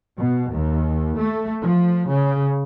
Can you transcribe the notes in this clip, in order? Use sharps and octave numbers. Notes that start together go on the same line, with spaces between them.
B2
D#2
A3
F3
C#3